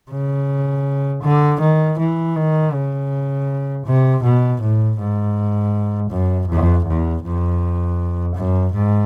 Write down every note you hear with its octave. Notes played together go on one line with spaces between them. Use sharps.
C#3
D3
D#3
E3
D#3
C#3
C3
B2
A2
G#2
F#2
F2
E2
F2
F#2
G#2